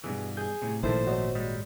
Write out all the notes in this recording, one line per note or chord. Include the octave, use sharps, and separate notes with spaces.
G2 B2 E3 G#4
G#4 G6
A2 C3
G#1 A#2 D#3 F3 A3 E4 A4 C5
F#4 C#5 D#5
G3 G#3